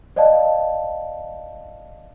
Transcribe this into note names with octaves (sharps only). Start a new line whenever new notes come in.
C5 D5 D#5 F5 A5